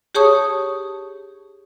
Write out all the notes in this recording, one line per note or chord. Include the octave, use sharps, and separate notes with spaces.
G4 G#4 C#5 A5 C#6 D#6